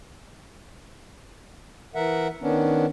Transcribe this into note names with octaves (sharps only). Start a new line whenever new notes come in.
E3 A#4 E5 F#5
D#3 B3 C#4 D4